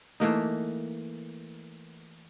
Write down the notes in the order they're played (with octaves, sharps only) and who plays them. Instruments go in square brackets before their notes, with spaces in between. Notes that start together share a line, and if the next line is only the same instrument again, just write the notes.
[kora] E3 A3 A#3 D#4